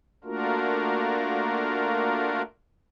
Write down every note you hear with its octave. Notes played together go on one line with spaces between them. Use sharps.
A3 A#3 D4 F4 F#4 A#4